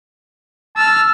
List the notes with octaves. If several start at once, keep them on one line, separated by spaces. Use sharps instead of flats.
A5 E6 F6